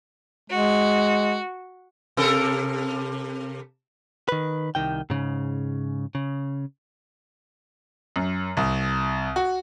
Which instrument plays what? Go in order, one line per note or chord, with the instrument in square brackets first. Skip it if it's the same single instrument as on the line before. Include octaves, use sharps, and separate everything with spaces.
[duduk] G#3 [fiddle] F#4
[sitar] C3 A4 A#4
[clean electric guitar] D#3 B4
C2 D#3 G5
G#2 C#3
C#3
[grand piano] F#2
C2
F#4